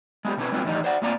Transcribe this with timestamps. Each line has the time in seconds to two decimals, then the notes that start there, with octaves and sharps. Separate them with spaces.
0.25 G#3 B3 G4
0.37 B2 C4 C#4 E4 B4
0.52 F#3 G#3 B3 C4 F4
0.65 E2 A2 D#3 G3 D#4
0.84 C5 D5 F#5
1.02 A2 A#3 C4 F4 D5 A#5